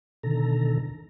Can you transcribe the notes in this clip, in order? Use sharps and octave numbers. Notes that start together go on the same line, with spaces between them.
B2 D3 D#3 A4 A#5